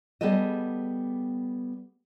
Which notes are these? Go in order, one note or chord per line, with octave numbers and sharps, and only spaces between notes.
G3 B3 G#4 A4 D#5